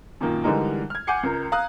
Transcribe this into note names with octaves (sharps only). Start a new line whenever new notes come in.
F#2 A#2 D#3 A#3
D3 E3 G3 G#3 D#4 A#4
F6 G#6
F#5 G#5 D6 G6 C7 C#7
C#2 A#4
F5 A#5 D#6 F#6